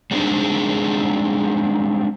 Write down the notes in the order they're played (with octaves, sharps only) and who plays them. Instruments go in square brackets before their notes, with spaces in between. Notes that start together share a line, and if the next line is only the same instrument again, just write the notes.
[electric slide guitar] G3 G#3 C4 D4 D#4 G#4